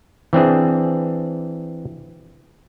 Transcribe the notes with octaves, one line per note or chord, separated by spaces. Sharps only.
E3 C4 D4 G#4